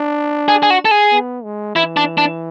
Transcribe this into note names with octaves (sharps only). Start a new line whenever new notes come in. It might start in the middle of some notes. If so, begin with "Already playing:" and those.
Already playing: D4
G#4
G#4
F#4
A4
G#4
B3
G#3
E3 E4
D4
D4